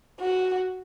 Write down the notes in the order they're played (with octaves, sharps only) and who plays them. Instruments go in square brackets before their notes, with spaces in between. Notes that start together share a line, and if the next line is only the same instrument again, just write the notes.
[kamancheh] F#4